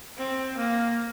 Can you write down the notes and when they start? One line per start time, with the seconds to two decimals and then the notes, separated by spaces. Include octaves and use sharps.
0.17 C4
0.57 A#3